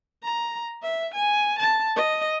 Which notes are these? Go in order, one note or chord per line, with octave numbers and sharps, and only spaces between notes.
A#5
E5
G#5
A5
D#5